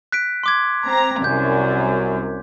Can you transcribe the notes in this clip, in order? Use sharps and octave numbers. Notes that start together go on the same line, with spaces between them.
F#6 B6 D7
C6 D6 G#6
C4 A#5
C2 F#2 G6